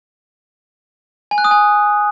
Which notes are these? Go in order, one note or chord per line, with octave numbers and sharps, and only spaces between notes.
G#5
F#6
D#6
G#5